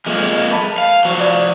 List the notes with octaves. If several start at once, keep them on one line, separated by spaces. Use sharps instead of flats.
F3 G#3 A#3
A5 B5
F5
F3 F#4
D5